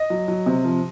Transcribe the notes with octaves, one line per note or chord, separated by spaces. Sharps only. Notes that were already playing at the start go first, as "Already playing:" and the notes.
Already playing: D#5
F#3
F#3
C3
F3